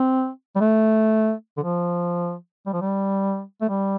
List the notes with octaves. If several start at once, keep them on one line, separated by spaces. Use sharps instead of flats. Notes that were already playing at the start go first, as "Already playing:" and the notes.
Already playing: C4
G3
A3
D3
F3
G3
F3
G3
A3
G3